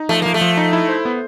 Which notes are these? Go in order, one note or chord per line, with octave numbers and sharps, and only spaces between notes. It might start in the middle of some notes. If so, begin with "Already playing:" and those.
Already playing: D#4
F3 A3
F3 A#3
A3
F3
D#4
E4
C5
B3